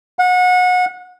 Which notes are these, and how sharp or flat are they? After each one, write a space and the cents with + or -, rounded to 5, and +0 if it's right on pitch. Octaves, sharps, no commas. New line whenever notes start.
F#5 -30